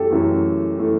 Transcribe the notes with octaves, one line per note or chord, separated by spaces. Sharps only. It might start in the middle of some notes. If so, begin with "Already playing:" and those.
Already playing: F#2 E3 A3 F#4 G4 A4
F#2 E3 A3
E3 A3